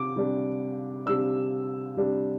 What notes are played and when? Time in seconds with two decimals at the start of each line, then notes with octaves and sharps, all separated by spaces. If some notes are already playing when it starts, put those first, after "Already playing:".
Already playing: C3 D6
0.16 C3 G3 D4
1.06 C3 G3 D4 E6
1.97 C3 G3 D4